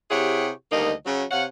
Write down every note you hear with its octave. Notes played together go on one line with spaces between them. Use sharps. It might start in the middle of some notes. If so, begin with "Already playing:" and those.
C3 E4 G4 G#4 C#5 F#5
D2 D#3 G3 A#3 D#4 D#5
C#3 F#3
C3 C#5 F5 F#5